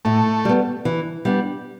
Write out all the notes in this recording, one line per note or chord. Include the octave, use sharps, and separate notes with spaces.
A2 A3
G3 B3
E3
G3 B3 D4